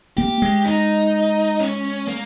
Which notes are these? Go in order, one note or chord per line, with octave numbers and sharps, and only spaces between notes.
A#3 G4
G#3
D#4
C#4
A#3